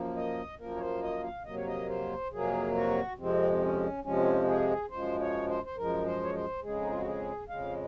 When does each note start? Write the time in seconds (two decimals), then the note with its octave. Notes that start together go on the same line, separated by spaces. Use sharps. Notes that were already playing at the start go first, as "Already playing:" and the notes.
Already playing: F#2 F3 A#3
0.16 D#5
0.59 F#2 F3 A#3 A#4
0.76 C#5
0.81 C5
1.02 D#5
1.23 F5
1.45 F2 C3 F#3 A#3 D#5
1.56 C#5
1.66 D#5
1.89 C5
2.32 F2 C3 F#3 A#3 G#4
2.75 F#4
3.18 F2 C3 F3 G#3 C4
3.53 C4
3.61 C#4
4.04 F2 C3 F3 G#3 C#4
4.47 G#4
4.90 F#2 F3 G#3 C5
5.20 C#5
5.49 C5
5.65 C5
5.77 F#2 F3 G#3 A#4
6.06 C5
6.24 C#5
6.34 C5
6.63 F2 C#3 G#3 G#4
6.81 D#4
6.90 F4
6.98 F#4
7.06 G#4
7.49 F2 C#3 G#3 F5